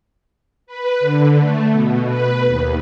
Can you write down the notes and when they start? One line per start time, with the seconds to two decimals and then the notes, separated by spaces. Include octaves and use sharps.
0.67 B4
1.00 D3
1.40 A3
1.72 B2
2.06 B4
2.47 D#2